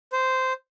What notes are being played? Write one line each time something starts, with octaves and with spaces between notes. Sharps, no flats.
C5